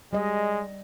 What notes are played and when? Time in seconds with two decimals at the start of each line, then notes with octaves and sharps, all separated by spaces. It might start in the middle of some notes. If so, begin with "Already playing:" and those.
0.13 G3 G#3 D#5